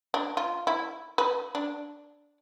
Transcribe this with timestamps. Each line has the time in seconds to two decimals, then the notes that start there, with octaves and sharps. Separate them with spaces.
0.14 D4
0.37 F4
0.67 E4
1.18 B4
1.55 D4